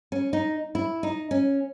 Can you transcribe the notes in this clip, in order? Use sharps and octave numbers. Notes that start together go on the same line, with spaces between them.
C#4
D#4
E4
D#4
C#4